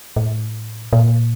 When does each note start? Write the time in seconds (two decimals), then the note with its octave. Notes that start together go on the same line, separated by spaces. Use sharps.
0.16 A2
0.93 A#2